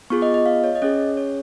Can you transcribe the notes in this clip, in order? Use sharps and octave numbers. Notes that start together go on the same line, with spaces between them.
B3 F4 G#4 C#6
D#5
D#5
F5
C#5
D#5
C#4 G#4 C#5
C#5